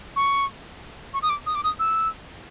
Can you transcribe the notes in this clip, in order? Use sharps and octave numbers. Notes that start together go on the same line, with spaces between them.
C#6
C#6
D#6
D6
D#6
D6
D#6
E6